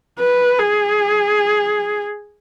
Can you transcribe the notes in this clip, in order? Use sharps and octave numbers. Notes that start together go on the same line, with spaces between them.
B4
G#4